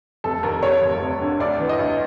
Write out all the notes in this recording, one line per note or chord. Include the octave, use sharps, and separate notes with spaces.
F1 A4
D#2 A#4
D#2 C#5
F1
F1
D3
D2 D5
E3
D#5
D2